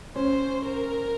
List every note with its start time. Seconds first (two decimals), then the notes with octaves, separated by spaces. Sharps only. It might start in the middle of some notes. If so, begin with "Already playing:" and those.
0.15 C#4 C5
0.64 A#4